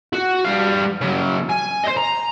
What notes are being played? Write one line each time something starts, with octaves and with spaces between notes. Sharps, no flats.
F#4
G3 F5
C#3 F#3
G#5
C5 D#5
A#5